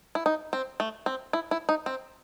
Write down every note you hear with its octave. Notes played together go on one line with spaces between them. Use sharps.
E4
D#4
C4
A3
C4
E4
E4
D#4
C4